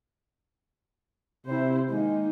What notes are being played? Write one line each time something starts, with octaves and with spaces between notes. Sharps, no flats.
C3 E4 C5
D#3 G#3 A#3 D#4